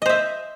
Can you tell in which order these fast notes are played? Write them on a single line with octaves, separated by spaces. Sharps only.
D#5 C5 E5